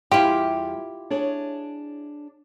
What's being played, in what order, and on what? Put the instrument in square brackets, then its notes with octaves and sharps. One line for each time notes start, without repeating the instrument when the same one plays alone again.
[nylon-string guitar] E2 G3 G5 [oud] E4 F4 [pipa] G4
[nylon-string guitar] D4 G#4 C#5